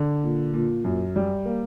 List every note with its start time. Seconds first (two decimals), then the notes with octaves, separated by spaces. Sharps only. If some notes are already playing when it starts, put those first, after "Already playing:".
Already playing: D3
0.23 A#2
0.54 A#2
0.84 F#2
1.16 G3
1.45 A#3